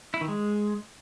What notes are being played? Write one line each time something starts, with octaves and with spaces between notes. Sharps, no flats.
E4
D#3
G#3